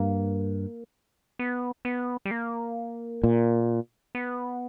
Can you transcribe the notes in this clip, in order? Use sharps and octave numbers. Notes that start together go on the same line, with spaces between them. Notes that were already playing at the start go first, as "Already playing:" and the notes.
Already playing: G2 A#3
B3
B3
G3
A#3
A#2
B3